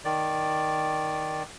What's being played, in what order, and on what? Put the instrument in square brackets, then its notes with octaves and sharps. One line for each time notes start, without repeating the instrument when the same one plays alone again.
[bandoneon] D#3 D5